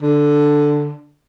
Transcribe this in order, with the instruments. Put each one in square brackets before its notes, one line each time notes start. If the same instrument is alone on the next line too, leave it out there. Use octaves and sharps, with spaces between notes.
[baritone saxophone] D3